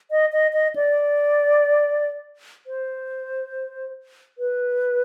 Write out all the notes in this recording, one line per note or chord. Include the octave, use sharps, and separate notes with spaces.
D#5
D#5
D#5
D5
C5
B4